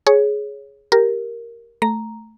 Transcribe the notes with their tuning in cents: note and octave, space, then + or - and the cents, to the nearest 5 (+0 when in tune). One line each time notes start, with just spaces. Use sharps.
G#4 +10 C#5 +0
G4 +0 A#4 +0
A3 +0 A#5 +0